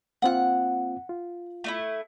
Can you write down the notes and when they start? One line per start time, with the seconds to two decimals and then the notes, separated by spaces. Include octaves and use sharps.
0.22 A#3 C4 F4 F#5 F#6
1.09 F4
1.64 A3 D#4 E4